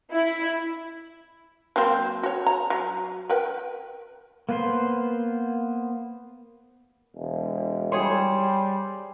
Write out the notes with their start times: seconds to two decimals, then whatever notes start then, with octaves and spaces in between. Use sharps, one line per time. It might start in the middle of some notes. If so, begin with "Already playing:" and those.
0.13 E4
1.76 F#3 A#3 C4
2.23 F#4 C#5
2.46 A#5
2.70 F#3
3.29 A#4 B4 G5
4.49 A#3 B3 B4 C5 C6
7.15 E1
7.92 G3 G#4 C5 C#5